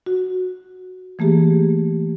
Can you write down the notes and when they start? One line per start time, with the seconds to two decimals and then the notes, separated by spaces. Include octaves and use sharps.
0.06 F#4
1.19 E3 A3 A#3 G4 G#4